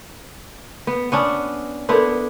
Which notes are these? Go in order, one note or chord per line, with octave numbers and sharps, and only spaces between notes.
B3
B3 C#4 D4
B3 D4 E4 A4 A#4 C6